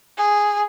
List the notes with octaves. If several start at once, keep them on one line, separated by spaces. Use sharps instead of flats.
G#4